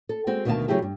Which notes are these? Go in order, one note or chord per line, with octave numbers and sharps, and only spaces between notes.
A4
G#3 C4 F#4
D2 B2 D#3 D#5 F5 A5
C#3 F#3 A3 E4 G4 G#4
G2